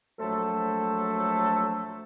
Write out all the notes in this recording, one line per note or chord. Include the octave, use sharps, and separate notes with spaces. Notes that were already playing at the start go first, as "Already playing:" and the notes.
A#1 F#3 A3 A4 C5